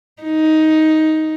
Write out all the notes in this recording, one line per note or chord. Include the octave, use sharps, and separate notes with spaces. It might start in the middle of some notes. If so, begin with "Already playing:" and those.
D#4